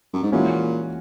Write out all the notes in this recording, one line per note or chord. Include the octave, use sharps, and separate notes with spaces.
F#2
G#2
A#2 E3 G#3 C#4 F#4